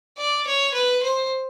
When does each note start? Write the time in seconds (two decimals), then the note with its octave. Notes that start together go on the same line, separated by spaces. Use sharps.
0.18 D5
0.47 C#5
0.74 B4
1.03 C5